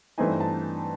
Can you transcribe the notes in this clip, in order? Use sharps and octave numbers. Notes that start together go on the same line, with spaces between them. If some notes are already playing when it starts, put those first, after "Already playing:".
G2 E3 A3 C4 D#4 G#5
A5